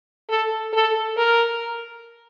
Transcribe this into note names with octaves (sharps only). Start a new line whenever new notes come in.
A4
A4
A#4